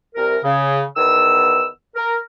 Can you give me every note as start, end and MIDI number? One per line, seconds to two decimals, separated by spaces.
0.15 0.36 36
0.15 0.36 70
0.43 0.83 49
0.97 1.66 40
0.97 1.66 51
0.97 1.66 59
0.97 1.66 88
1.95 2.16 70